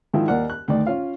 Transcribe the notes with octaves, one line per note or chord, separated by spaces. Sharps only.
G#2 D#3 F3 E4 F4
D#2 A#4 D5 F#5
F#6
D2 D#3 D5
C#4 F4 F5